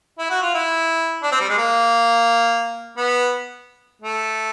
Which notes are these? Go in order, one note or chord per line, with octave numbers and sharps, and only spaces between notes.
E4
F#4
F4
E4
D4
C4
G3
G#3
A#3
B3
A3